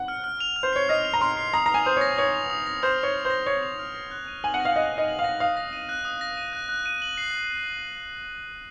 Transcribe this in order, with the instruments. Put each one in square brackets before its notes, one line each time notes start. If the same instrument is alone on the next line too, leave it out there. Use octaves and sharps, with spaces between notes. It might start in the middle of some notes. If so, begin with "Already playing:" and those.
Already playing: [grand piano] F#5
[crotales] F6
F6
F7
F6
[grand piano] C5
[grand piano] C#5 [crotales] C7
[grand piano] D#5 [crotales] F6
[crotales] F7
[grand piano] A#5
[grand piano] C6 [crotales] F6
[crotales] C7
[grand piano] A#5 [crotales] D#6
[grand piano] A#5 [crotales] F7
[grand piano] G#5
[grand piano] C5 [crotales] D#6
[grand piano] C#5 [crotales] A#6
[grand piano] C#5 [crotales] D#6
[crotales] F7
D#6
A#6
[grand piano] C5 [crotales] F6
[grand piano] C#5 [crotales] F7
[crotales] F6
[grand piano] C5
[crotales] A#6
[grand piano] C#5 [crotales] F6
[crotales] F7
F6
A#6
F#6
D#7
[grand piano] G#5 [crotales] F#7
[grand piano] F#5
[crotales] A#6
[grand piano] F5
[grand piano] D#5 [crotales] F#6
[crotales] D#7
[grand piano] D#5
[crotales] F#7
[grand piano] F5
[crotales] A#6
[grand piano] F5 [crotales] D#6
[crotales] A#6
D#7
F#6
D#6
A#6
D#7
F#6
F#6
D#7
F#7
C7